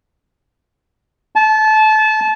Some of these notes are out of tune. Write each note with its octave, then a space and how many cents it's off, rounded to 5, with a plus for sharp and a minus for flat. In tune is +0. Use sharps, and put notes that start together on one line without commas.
A5 -25